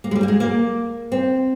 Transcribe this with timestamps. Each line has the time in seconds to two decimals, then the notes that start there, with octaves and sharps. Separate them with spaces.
0.04 A#3
0.11 G#3
0.15 G3
0.23 A#3
0.28 G#3
0.40 A#3
1.12 C4